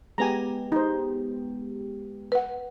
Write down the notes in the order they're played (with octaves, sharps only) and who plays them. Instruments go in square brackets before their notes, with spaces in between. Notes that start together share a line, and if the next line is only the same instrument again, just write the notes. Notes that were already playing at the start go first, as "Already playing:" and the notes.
[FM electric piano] G#3 B3 G4 [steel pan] G#5 A#5
[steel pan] D#4 C5
[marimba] B4 F#5